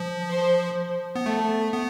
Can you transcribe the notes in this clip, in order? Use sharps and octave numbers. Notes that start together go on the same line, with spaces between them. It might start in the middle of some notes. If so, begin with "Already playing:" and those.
Already playing: F3
C5
B3
A3 A4
B3